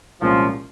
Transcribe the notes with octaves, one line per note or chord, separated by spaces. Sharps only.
C2 A#2 F3 G#3 C#4